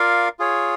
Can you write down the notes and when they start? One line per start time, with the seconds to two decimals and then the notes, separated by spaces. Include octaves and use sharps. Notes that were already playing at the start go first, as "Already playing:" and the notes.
Already playing: F4 A#4 D5 F5
0.39 F4 G#4 C#5